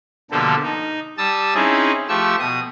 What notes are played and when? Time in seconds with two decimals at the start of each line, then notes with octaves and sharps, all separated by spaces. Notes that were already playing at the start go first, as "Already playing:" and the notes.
0.31 B2 D3 F3 A#3 G4 A4
0.63 D#4
1.18 G3 A5 D#6 E6
1.55 C4 C#4 D#4 E4 G#4
2.08 F3 A3 G4 C#6 E6
2.39 B2 D#6